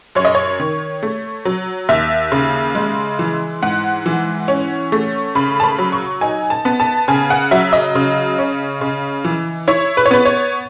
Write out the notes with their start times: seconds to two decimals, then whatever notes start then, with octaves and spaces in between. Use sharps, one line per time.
0.15 F#2 C#5
0.25 D#5
0.35 C#5
0.60 D#3
1.03 A3
1.45 F#3
1.89 D#2 E5
2.32 C#3
2.75 G#3
3.19 E3
3.63 G#2 F#5
4.06 E3
4.48 C#4
4.92 A3
5.35 C#3 B5
5.60 A5
5.64 B5
5.78 F#3
5.92 C#6
6.21 D#4 G#5
6.50 A5
6.65 B3
6.80 A5
7.08 C#3 G#5
7.30 F#5
7.51 F#3 E5
7.73 D#5
7.95 C#3
8.39 C#4
8.81 C#3
9.25 E3
9.68 E4 C#5
9.97 B4
10.06 C#5
10.11 B3 B4
10.25 C#5